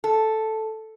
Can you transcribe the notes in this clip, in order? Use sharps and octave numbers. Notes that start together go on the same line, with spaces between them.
A4